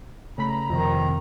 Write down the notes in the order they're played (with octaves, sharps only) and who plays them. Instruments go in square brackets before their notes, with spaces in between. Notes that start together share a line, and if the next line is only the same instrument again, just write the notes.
[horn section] G2 A#5 [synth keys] C#3 A3 B5
[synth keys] F2 C3 [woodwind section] D#3